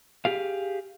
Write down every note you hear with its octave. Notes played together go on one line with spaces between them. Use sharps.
G4 G#4 F5